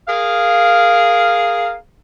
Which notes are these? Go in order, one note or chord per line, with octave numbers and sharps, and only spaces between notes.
G#4 A#4 F5